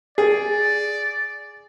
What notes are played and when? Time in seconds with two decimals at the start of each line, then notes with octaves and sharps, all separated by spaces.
0.18 G#4 D5